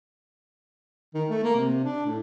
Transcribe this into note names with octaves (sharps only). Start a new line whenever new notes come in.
D#3
A3
A#3
C3
D4
A2